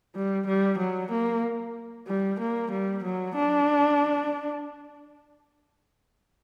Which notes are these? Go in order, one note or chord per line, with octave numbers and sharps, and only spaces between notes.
G3
G3
F#3
A#3
G3
A#3
G3
F#3
D4